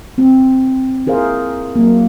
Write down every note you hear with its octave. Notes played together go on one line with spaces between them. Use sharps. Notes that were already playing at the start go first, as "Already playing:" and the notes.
C4
E4 G#4 A#4 C5 F5
F#3 A#3